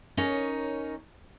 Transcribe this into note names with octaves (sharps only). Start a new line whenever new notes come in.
C#4 D#4 A#4 C#5